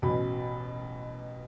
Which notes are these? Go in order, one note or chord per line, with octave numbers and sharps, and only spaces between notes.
A1 F#2 B2 B5